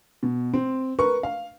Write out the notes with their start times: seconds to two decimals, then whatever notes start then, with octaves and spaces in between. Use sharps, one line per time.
0.23 B2
0.53 C4
0.99 A#4 B4 C#6
1.23 F5